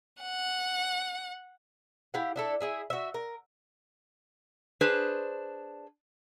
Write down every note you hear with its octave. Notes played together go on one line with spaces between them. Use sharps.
F#5
E4 G4 F5 F#5
D4 E4 A4
E4 G#4 E5
F#4 E5
A#4
D4 G#4 B4 C5